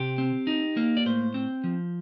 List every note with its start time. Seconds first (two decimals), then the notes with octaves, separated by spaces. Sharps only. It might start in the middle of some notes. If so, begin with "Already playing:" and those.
Already playing: C3 G4
0.18 C4
0.47 D#4
0.77 A#3
0.97 D5
1.05 A2 C5
1.34 C4
1.64 F3